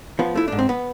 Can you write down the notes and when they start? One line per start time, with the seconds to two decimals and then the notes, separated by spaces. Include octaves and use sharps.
0.19 F3 B3
0.35 A3 E4
0.48 G#2 D4
0.59 C4
0.69 B3